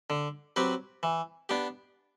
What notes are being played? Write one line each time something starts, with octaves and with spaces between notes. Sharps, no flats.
D3
F#3 C4 G4 B4
E3
B3 D4 G4